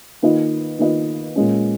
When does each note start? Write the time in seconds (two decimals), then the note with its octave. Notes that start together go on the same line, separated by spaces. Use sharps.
0.22 D#3 A#3 F4 B4 D#5
0.79 D#3 A#3 F4 B4 D#5
1.36 A#2 G#3 C#4